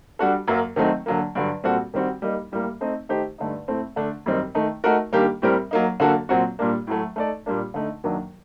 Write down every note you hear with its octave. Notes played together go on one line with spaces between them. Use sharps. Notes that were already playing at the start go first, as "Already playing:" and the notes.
G3 D4 F#4 A4
F#2 F#3 A#3
D#3 F#3 A3 C4 D#4
D3 F#3 A#3
G2 D3 F#3
A#2 G3 C4 F#4 A4
D#3 G3 C4 F#4
G3 A#3 D#4
A2 G3 A#3
A3 C4 D#4
D#3 A3 D#4 G4 C5
G2 D3 A3 D#4
A2 A3 C4
D3 A3 D4
F#2 D#3 G3 C4 D#4
D#3 A3 D#4
A3 D#4 F#4 A#4
D#3 G3 A#3 D4 G4
A2 G3 C4 G4 A#4
F#3 A#3 D#4
D3 F#3 A#3 F#4 A4
A#2 F#3 C4 F#4
A#2 G3 A#3 D4
A2 F#3 A3
A3 D#4 A4 D5
A#2 G3 A#3 D4
D3 A3 D#4
F#2 D#3 F#3 A#3 D4